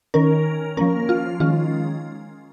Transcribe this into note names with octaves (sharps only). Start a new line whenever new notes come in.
D#3 C#4 A#4
F3 A#3 C#4 A#4
F4
D#3 G#3 C#4 F4